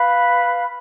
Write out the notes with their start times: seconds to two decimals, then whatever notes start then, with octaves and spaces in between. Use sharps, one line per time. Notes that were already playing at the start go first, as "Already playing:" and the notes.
Already playing: B4 F5 B5